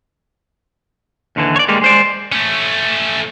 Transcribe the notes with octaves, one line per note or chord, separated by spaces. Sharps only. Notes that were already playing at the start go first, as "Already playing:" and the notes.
D#2 D3 E3
C#5 D5
G3 G#3 A#3
G#3 C5 D5
A3 C#4